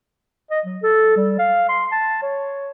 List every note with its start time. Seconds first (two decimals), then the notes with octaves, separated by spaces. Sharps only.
0.51 D#5
0.66 F#3
0.83 A4
1.16 G3
1.39 F5
1.69 C6
1.92 A5
2.23 C#5